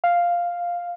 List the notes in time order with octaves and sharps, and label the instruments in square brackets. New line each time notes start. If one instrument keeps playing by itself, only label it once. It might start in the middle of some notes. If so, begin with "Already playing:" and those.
[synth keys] F5